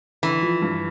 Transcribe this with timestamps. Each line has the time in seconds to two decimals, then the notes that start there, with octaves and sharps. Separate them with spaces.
0.23 D3 E3
0.42 F3
0.62 G2